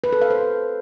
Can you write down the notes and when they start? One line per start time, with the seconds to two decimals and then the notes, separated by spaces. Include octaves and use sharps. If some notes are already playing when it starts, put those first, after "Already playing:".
0.04 B4
0.13 A4
0.22 F5
0.30 C5